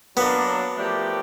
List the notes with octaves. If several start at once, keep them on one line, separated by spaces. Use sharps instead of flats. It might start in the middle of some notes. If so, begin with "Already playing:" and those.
F#3 A#3 B3 D4
F3 A3 D4 G4 A#4